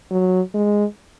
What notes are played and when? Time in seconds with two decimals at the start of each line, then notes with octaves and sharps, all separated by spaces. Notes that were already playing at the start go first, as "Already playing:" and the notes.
0.11 F#3
0.54 G#3